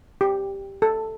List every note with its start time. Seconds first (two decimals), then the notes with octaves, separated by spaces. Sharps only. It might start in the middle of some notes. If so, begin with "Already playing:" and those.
0.21 G4
0.82 A4